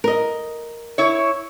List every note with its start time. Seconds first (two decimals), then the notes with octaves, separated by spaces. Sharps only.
0.04 A#4 D#5
0.98 E4 C#5